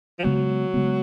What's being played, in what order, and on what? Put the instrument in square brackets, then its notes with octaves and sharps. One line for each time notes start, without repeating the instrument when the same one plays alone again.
[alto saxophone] F3
[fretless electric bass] C#3 G#3 B3 [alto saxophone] F#3
[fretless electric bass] C#3 G#3 B3